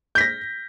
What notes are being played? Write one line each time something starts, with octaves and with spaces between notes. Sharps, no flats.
G6 A#6 B6